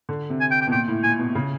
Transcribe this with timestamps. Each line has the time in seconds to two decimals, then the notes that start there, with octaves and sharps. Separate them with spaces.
0.09 D3
0.30 C3
0.40 G#5
0.51 G5
0.61 G5
0.67 B2
0.72 A#2 G5
0.88 A2
1.03 A#2 G#5
1.19 B2
1.35 C#3